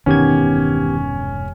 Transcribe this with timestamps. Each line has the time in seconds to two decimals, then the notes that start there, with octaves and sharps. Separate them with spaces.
0.06 E1 G2 C3 D#3 B3 C#4 G4 G#6